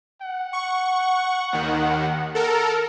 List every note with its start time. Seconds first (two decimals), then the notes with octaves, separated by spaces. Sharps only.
0.22 F#5
0.53 C#6
1.53 D#2 D#3
2.35 A4 A#4